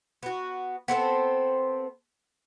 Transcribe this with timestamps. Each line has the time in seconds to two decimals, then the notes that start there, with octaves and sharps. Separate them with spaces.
0.23 B3 F#4
0.88 B3 C4 A4 C5